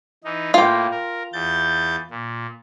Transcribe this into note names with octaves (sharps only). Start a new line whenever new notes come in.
E3 D#4
A2 A#3 F4 G5
A#4
E2 G6 A6
A#2